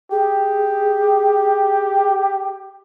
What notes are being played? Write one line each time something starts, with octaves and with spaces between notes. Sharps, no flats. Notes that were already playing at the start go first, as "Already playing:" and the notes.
G4 G#4